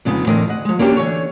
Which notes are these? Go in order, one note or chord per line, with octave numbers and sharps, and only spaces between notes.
F2 C#3 G#3 B3 D#4
A2 D3 E3 C4 A#4 D#5
D2 D#5 F#5
F3 G#3
A#3 C#4 D4 F#4 G4
D3 E3 C#5